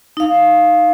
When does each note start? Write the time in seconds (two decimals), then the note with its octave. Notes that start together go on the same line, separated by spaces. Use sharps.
0.17 D#4 F5